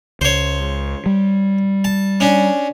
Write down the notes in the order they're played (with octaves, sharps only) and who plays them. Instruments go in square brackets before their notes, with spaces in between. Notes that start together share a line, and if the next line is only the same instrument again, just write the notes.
[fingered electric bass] C#2 [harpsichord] C5 C#5
[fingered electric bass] G3
[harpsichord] A5
C#4 D4